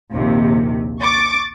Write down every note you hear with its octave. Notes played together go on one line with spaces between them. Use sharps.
A#1 D#2 C3
C#6 D6 A6